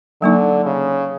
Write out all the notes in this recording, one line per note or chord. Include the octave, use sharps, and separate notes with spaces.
D3 F#3 A#3 D#4
C#3